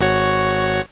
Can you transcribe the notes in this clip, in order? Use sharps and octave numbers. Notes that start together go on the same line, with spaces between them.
G#1 F#4 C#5